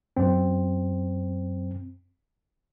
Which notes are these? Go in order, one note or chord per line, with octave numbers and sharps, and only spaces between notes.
F#2 C4